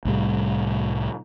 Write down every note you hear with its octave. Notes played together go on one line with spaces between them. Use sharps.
C2 A2 G3